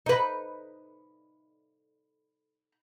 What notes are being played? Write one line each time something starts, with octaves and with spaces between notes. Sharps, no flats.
D#4 B4